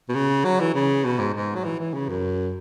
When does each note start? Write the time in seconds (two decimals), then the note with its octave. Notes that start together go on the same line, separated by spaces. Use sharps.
0.09 B2
0.15 C#3
0.44 F#3
0.60 E3
0.74 C#3
1.04 B2
1.19 G#2
1.34 G#2
1.55 F#3
1.64 E3
1.79 E3
1.94 C#3
2.09 F#2